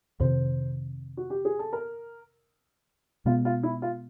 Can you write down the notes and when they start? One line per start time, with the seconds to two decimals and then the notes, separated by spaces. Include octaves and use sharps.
0.20 F2 C3 D#3 C5
1.17 F#4
1.30 G4
1.45 G#4
1.59 A4
1.73 A#4
3.25 B2 G#3 B3 F4
3.45 F4
3.63 E4
3.82 F4